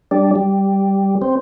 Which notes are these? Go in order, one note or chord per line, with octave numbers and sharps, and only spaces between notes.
G3 D4
G3
C4